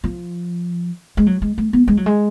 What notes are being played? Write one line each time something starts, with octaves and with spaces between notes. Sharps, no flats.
F3
G#3
F#3
G#3
A3
B3
G#3
F#3
G#3